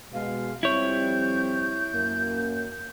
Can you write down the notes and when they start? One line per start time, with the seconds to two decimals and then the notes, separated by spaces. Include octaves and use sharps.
0.13 B2 G#3 F5
0.63 F2 G3 C4 E4 C#5 G6
1.94 F#2 A#3